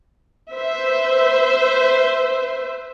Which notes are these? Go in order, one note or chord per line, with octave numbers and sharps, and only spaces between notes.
B4 C5 E5